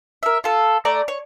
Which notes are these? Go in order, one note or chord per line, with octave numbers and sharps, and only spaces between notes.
A#4 E5
F4 A4
A3 D5 A#5
C#5